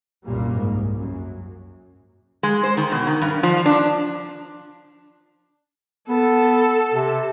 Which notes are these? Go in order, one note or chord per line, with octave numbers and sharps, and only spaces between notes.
C2 F#2 A#2 G3 A#3
G#2
F#2
G#3
C5
D#3
B2
D#3
G2
F3
D4
B3 A4
C3